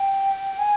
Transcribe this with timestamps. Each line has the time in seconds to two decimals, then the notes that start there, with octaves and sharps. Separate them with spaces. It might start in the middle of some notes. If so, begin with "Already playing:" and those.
Already playing: G5
0.59 G#5